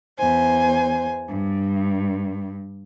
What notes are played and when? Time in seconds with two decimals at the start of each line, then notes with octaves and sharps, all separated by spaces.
0.19 E2 C5 G#5
1.29 G2